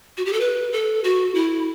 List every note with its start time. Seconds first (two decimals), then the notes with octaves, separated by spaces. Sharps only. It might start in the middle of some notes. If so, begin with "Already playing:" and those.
0.17 F#4
0.26 G4
0.33 A4
0.40 B4
0.72 A4
1.04 F#4
1.35 E4